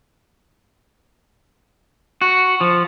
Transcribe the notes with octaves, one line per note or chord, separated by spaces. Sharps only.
F#4
F3